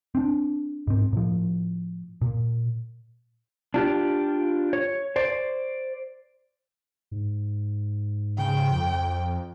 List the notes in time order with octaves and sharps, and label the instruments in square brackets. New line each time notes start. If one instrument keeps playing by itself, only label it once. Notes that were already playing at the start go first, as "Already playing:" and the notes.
[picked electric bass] C4 D4
G#2 C4
A2 F3
A#2
[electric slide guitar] D4 F4 G4
C#5
C5 D5
[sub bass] G#2
[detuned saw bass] C#3 [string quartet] G5
[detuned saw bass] F2